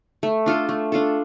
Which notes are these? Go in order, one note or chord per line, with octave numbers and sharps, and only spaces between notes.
A3
D4 F4 A4
A3
D4 F4 A4